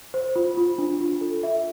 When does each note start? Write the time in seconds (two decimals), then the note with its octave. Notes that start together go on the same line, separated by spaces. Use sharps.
0.14 C5
0.36 F4
0.57 F4
0.78 D4
1.00 F4
1.21 A4
1.43 E5